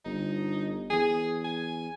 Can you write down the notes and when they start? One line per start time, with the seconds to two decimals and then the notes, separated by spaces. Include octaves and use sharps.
0.05 G1 D#4
0.90 E2 G#4
1.44 G#5